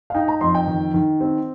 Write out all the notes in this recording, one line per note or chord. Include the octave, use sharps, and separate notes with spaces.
F5
D#4 G5
A#5
F2 C6
G5
D#3
D#3
C4